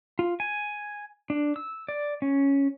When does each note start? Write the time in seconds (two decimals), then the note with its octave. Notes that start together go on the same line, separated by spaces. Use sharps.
0.19 F4
0.40 G#5
1.30 D4
1.56 E6
1.88 D5
2.22 C#4